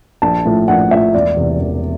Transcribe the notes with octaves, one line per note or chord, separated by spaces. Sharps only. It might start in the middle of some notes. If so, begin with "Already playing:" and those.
A#1 A5
A2 F3
A#1 F#5
A2 F3 E5
E1 D5
E2 C3
E1